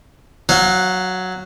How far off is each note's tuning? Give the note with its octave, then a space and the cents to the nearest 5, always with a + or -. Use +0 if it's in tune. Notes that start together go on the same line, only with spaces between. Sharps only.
F#3 +0 F5 +30